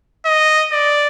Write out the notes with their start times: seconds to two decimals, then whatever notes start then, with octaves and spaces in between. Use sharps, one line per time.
0.26 D#5
0.73 D5